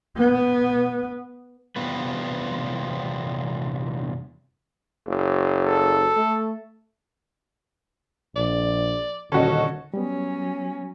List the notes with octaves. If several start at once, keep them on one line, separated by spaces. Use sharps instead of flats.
B3
E2 C3 G3 B3 F4 B4
F#1
A4
A3
A#1 D5
D#1 D3 C#4 F#4 A4 D#5
F#3 G3 B3 C#4